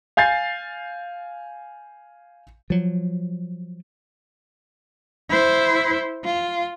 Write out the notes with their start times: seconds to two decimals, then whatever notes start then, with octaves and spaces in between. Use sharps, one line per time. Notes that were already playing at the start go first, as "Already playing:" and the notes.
0.17 F5 G#5 G6 A6 C7
2.70 F3 F#3
5.30 E4 C5
6.24 F4